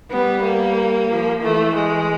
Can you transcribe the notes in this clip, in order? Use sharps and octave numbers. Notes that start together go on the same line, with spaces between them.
G3 B3
A#3
F3
E3 A3
G#3